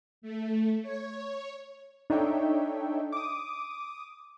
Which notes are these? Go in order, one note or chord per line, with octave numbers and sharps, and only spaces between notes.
A3
C#5
D4 D#4 A4 C#5 E5 G5
D6 D#6